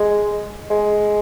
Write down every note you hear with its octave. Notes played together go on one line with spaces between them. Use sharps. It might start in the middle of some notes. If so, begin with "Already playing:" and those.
Already playing: G#3
G#3